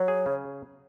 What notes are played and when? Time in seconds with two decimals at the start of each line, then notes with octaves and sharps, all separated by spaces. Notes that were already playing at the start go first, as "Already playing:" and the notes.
Already playing: F#3 C#5
0.08 G#4
0.26 C#3